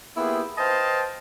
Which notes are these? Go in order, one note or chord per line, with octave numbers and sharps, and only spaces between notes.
A#3 B3 E4 F4 G4 G#4
B4 C5 D#5 F5 G5 A5